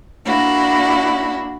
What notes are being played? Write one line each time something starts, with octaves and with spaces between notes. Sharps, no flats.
A#3 D4 E4 F#4